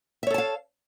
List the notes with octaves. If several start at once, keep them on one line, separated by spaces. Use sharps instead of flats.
A4 C#5 E5 F5 A5